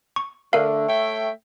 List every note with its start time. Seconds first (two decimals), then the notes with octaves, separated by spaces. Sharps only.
0.16 C#6
0.53 D3 A3 A#4 F5
0.88 C#5 E5 G5